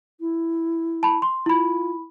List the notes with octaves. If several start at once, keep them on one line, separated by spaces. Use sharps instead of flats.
E4
A5 B5
C6
E4 F4 B5